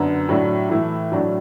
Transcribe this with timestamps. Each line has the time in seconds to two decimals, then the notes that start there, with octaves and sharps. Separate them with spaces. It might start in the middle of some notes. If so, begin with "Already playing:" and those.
Already playing: F#2 D3 B3 D4
0.29 A2 F#3 D4
0.69 A2 E3 A3 E4
1.12 A2 F#3 D4